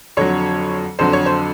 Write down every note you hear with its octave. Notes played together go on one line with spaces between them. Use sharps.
F2 D3 F#3 C#5
F2 D3 F#3 C5
C#5
C5